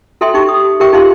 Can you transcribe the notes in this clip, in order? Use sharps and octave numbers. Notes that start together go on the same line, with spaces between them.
F#4 A4 E5 G5 C6
D#4 G4 G5 C#6
D#6
G4 G#4 A#4 E5 G5 C#6
D#4 F4 G4 F5 C6